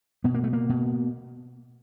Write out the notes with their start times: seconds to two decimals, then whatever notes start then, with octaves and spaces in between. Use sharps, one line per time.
0.24 B2 B3
0.34 A#3
0.44 A3
0.53 A#3
0.69 B2